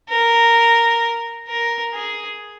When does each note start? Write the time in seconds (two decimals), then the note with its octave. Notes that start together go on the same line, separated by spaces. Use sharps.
0.10 A#4
1.48 A#4
1.94 G#4